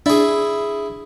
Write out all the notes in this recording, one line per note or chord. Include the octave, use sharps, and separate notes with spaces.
D4 E4 G#4